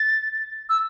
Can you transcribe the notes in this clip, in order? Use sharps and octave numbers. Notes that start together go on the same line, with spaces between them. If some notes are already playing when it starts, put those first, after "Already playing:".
Already playing: A6
E6